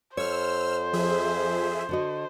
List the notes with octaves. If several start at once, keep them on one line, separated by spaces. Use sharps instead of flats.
F2 C5 C#5 E6 F6
F3 G#4 E5
D3 F#4 D#5